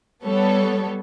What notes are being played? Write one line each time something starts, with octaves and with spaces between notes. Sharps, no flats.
G3 B3 A4 C#5